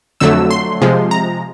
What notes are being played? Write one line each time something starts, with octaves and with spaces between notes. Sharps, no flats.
F2 D3 F#3 A3 E6
C6
C3 F3 G#3
A#5